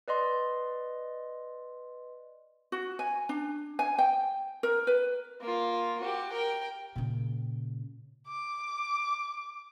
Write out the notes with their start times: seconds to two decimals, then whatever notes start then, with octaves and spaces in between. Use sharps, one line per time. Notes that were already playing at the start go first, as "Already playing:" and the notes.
0.08 B4 D5 D#5 C6
2.72 F#4
2.99 G#5
3.29 D4
3.79 G#5
3.99 G5
4.63 A#4
4.87 B4
5.41 A#3 F4
6.00 F#4 G4
6.32 A#4 G5
6.96 A#2 C#3
8.27 D6